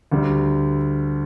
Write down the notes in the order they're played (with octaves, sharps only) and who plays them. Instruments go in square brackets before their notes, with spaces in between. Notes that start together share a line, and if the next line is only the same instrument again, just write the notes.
[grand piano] D2 D3 G3